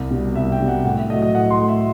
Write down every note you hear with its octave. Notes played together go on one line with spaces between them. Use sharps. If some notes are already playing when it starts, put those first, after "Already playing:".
Already playing: C2
B2 G3
C2 E5
G5
B2 G3
F#5
A2 F#5
E5
F#3 A3 D#5
D#5
A2 F#5
C6
F#3 A3
E5